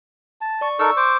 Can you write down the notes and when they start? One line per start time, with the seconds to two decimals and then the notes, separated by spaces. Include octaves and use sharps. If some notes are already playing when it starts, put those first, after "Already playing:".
0.41 A5
0.61 D5 C#6
0.79 D#4 A4 A#4 C#6 E6
0.97 C5 D6